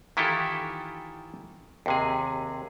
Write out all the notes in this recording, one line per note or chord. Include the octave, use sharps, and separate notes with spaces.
D#3 E3 E4 F4 G4 A4
D#2 C3 G#4